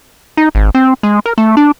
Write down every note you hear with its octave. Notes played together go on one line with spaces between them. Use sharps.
D#4
G#1
C4
G#3
A#4
A3
D4